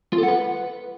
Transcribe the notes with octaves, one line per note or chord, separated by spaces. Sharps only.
F4
A4
F#5
B4